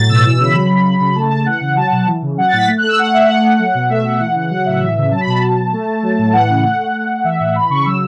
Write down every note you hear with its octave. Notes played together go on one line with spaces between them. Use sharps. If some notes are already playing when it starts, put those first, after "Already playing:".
Already playing: A2 F#3 A6
B2 E6
E3 E6
C#3
B5
F#3
C#3
F#3
C#3
A3 A5
A3 A5
E3 F#5
C#3 F#5
F#3 A5
F#5
B2
E3
C#3
F#3 F#5
A6
A2
B6
A3
F#6
A3
E6
A3 F#5
A3 E5
A3 F#5
A3
F#3
B2
A3 E5
A3 F#5
E3 F#5
C#3 F#5
F#3 F#5
A2 E5
E3 E5
C#3 E5
F#3 A5
B5
B2 A5
F#3
B2
A3
A3
F#3
A2
E3 F#5
C#3
A3
A3
A3
A3
E3 E5
F#5
A2
F#5
E3 B5
C#3 C#6
F#3 E6